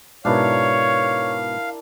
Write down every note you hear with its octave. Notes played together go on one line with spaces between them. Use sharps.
G#2 B2 D4 E4 A#4 C#5 F5